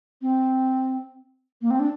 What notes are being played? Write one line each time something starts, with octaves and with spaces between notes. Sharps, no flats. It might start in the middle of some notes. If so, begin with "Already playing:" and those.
C4
A#3
C4
D4